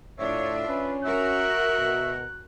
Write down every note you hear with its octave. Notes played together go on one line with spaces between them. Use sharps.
A2 D4 F4 C#5 E5
C#4 B4
F#4 A#4 E5 F#6
B2